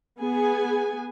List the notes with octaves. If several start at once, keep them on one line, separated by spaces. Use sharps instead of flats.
B3 G#4 G#5